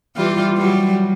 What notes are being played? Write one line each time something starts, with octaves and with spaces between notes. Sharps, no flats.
E3 G3 F4
F#3 G3